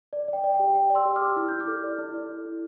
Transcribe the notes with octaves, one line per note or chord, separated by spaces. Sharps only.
D5
D5 G5
D5
G5
G4
D5 G5
D5
C6 E6
G4
D6 F6
G4
E4 F6
E4 G6
D6 F6
A4
D5
E4
D5
A4
E4